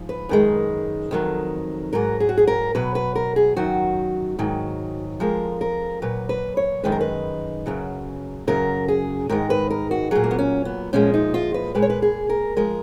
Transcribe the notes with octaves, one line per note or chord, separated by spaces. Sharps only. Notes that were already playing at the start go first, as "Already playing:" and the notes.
Already playing: G#2 F3
B4
F#2 D#3 G#3
F2 D#3 F#3
G#2 F#3 A#4
G#4
F#4
G#4
A#4
B2 F#3 B4
B4
A#4
G#4
F#2 D#3 F#3 F#4
G#2 D#3 F#3
F2 F3 G#3 A#4
A#4
A#2 F#3 B4
B4
C#5
F#2 D#3 G#3 B4
A#4
B4
F#2 C#3 F#3
F#2 C#3 F#3 A#4
G#4
G#2 D#3 G#3 A#4
B4
A#4
F#4
A#2 F#3 G#4
A#3
B3
C#4
B3
A#2 F3 G#3 C#4
D#4
F4
B4
A#2 G#3 B4
C#5
B4
G#4
A#4
F3 G#3 A#4